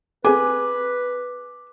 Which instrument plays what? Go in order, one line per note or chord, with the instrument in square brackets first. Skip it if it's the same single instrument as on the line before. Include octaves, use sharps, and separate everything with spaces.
[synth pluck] C4 G#4 A4 [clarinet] B4 [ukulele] G#5 [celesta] D6